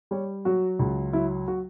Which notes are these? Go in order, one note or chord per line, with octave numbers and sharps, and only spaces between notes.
G3 C#5
F#3 F#4
C#2
F#3 E4
F#4